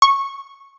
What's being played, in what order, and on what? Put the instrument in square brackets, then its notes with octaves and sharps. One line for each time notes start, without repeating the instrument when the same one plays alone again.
[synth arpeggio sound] C#6